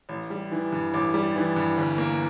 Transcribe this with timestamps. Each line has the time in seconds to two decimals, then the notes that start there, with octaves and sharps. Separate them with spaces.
0.09 A1
0.30 G3
0.52 E3
0.72 G2
0.94 A1 D6
1.14 G3
1.35 E3
1.56 G2
1.77 G1
1.98 A#3